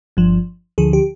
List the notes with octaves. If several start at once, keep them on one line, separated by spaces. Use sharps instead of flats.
G1 G2 F3
D2 D3 F3 G#4
G4